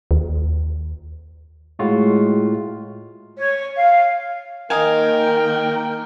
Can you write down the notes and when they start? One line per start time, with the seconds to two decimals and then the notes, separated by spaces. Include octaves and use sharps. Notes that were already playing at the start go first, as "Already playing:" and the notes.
0.11 D#2
1.79 A2 G#3 F4 F#4
3.38 C#5
3.77 F5
4.70 D#3 A#3 A#4 D#5 F5 G5 G#5